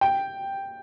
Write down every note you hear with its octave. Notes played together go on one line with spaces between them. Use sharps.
G5